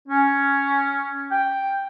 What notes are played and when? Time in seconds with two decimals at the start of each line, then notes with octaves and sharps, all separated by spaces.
0.07 C#4
1.31 G5